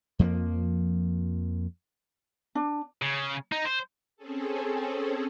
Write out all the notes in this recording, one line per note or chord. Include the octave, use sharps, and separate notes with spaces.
F2 F3 A3 A#3
D4
C#3
D#4
C5
C4 C#4 G#4 A4